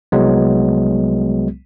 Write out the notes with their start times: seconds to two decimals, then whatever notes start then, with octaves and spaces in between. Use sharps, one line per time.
0.12 C2 F#3 G#3 B3